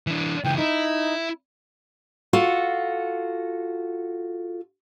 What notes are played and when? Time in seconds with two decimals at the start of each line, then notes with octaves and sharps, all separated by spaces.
0.07 E3 D4
0.44 C#2 E3 G5
0.57 D#4 E4
2.33 F4 F#4 A4